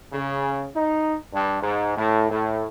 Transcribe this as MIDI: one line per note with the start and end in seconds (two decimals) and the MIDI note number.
0.12 0.66 49
0.75 1.15 63
1.32 1.59 43
1.62 1.94 44
1.97 2.25 45
2.29 2.65 45